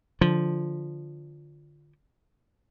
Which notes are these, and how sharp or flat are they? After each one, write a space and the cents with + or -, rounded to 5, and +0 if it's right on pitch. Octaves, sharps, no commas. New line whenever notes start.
D3 -5 F3 +0